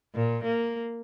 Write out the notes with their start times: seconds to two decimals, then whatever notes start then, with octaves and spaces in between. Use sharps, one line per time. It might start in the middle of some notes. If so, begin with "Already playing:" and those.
0.15 A#2
0.44 A#3